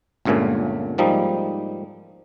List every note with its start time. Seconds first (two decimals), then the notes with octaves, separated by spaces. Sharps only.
0.25 G1 C#2 G2 A#2 C#3 A3
0.98 G#2 F3 G3 A#3 D#4